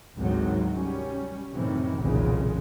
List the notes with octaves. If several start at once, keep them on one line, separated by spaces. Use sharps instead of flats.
G#1 D2 G#2 C3 D#3 F#3
G3 C#4
F#2 A2 C3 D#3 E3
F1 B1 E2 A#2 C#3 G#3